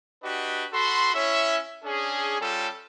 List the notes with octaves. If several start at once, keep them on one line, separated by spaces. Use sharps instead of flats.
D4 F#4 G4 B4 D#5
F#4 A4 B5 C6
C#4 E4 C#5 E5
C#4 D4 G#4
G3 C#4 F4 G4 A4